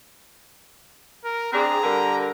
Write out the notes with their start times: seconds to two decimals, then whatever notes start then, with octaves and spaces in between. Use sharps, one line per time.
1.24 A#4
1.53 C4 D4 G#4 A#5
1.83 D3 G3 A#4